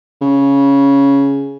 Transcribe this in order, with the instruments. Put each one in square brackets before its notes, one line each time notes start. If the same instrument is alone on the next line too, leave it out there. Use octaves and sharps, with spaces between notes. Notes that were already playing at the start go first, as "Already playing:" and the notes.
[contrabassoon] C#3